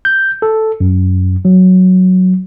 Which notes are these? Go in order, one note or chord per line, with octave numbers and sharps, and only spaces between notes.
G6
A4
F#2
F#3